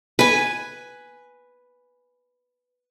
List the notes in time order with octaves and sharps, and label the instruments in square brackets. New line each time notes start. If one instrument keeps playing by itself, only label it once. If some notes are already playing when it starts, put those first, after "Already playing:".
[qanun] B4 G#5